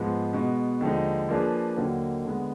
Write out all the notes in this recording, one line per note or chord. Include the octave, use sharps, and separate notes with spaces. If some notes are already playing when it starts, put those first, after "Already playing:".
Already playing: G#2 F3 G#3 B3
B2 G#3 B3
D#2 D3 F3 G#3 D#4
F3 A#3 D4 G#4 B4
D#2 D3 F#3 A#3 D#4
D3 G#3 B3